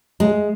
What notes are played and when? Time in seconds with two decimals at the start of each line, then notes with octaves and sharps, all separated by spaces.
0.20 G#3